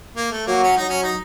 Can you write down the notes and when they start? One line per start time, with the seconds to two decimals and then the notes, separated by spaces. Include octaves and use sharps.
0.16 A#3
0.31 A3
0.46 F#3 A#3
0.63 C#4
0.76 F#3 D#4
0.89 C#4
1.03 D#4